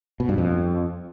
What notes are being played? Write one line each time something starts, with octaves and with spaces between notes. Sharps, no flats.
B2
G2
F2